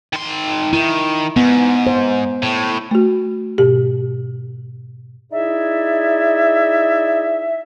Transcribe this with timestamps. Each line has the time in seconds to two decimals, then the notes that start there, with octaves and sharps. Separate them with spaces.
0.13 D#3 C6
0.73 D#3 E4
1.36 G#2 B3
1.87 C5
2.43 A2
2.91 A3 F#4
3.58 G#2 B2 G4
5.32 D#4 E4 G#4 D5 E5